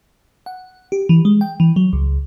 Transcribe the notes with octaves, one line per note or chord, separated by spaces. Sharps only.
F#5
G4
E3
G#3
G5
E3
F#3
C#2